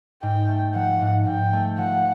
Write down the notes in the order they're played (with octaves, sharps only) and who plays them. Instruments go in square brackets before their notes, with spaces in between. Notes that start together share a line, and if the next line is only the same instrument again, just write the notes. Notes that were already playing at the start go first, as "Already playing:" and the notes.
[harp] G#2 [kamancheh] G5
[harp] A3
[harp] F3 [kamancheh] F#5
[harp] G#2
[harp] G#2 [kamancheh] G5
[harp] A3
[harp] F3 [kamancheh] F#5